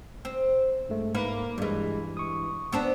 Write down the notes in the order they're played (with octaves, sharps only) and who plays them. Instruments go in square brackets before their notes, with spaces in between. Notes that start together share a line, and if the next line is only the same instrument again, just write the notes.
[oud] C4
[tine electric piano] G2 G#3 A3
[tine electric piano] G#2 [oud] A#3 B4
[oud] G2 E3 [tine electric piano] G3 G#3
[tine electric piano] C#6 D#6
[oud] B3 C4 D4